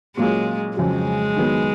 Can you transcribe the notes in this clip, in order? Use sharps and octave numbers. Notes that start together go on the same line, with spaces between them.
A#2 F#3 G#3 A#3 C#4 F4
F2 C#3 F#3 G#3
D#3 F#3 B3